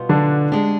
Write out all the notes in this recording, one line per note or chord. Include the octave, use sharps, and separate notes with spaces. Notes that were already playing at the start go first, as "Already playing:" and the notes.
Already playing: B2 G3 B3 F4 C5
D3 D4
G#3 D4 G4